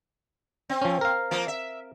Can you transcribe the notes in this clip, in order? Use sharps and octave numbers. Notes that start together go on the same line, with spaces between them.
C4
F3 C#4
A#4 F5
F3 A#3
E5